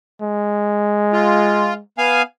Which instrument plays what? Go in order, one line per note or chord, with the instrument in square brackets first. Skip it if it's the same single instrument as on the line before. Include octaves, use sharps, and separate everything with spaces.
[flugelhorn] G#3
[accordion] F4
B3 F5 G#5